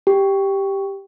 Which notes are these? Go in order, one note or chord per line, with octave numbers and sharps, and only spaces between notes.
G4